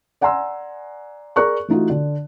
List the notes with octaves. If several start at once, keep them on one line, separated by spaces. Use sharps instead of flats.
D5 F#5 G#5 A#5 C6 E6
G#4 A#4 D5 C#6 F#6
E3 A3 D#4 F4 F#4
D3